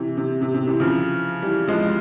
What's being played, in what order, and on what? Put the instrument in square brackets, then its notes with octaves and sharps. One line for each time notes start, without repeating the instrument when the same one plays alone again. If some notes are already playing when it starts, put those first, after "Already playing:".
Already playing: [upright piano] C3 E3
C3
C3
C3
C3 E3
C#3 F3
E3 G3
F3 G#3